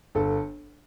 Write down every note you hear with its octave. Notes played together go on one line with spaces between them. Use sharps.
G1 A4